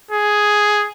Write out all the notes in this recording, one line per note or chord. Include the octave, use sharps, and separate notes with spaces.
G#4